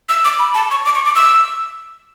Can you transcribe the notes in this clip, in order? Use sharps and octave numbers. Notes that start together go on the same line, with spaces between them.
E6
D6
B5
A5
C#6
D6
C#6
D6
E6